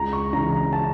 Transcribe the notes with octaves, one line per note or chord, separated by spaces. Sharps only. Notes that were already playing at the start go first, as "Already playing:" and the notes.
Already playing: C#2 A#5
C#6
C#3 E3 A#5
A#5
A5